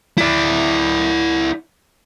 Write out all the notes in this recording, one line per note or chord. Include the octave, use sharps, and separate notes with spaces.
E4 D5